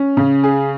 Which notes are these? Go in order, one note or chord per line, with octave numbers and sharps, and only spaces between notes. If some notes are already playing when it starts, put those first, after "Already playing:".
Already playing: C#4
C#3
G#4